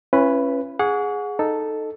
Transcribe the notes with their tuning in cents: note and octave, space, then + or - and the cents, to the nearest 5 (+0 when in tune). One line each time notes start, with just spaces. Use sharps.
C#4 -20 E4 +40 B4 +0
G#4 +0 F#5 -25 C#6 +35
D#4 -10 A4 +0